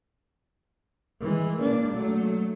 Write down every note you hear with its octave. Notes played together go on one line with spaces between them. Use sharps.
E3 G#3
A#3 D4
F#3 A3